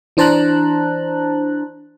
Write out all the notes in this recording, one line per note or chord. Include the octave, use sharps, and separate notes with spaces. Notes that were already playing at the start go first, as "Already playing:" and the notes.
E3 D4 C5 A5 A#5 F#6